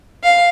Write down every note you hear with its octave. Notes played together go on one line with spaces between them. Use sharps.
F5